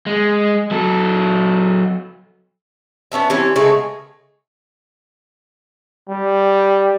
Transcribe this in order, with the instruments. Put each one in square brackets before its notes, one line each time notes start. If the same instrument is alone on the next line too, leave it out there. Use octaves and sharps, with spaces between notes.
[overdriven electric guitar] G#3
F#3 A4
[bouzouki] B3 C#4 D4 E5
E3 G3 C4 C#4
C#3 G#3 A3 B3
[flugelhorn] G3